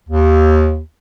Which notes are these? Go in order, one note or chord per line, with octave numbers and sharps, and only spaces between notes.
D#2